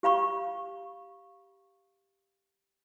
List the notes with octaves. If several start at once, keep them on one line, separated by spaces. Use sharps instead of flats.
G4 F5 B5 C#6